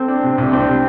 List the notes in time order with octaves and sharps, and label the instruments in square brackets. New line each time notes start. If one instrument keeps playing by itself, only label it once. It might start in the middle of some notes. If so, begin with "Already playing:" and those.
Already playing: [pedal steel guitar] C4 [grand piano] A4
[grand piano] D4
C3
C2
[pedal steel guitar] C4 [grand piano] D4
[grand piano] G3